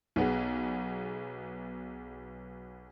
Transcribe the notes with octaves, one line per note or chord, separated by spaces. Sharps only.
B1 B3 G#4